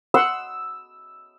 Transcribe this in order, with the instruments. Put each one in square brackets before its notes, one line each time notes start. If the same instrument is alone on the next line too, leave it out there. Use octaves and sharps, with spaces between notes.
[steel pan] F#5 C6 [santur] E6